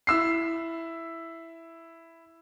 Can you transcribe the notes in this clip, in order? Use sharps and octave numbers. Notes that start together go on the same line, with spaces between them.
E4 E6 C7